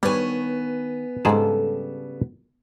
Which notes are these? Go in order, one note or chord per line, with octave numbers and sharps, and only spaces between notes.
D#3 G3 B3 B4 C#5 G#5
G#2 C#3 G3 G#4 A4 A5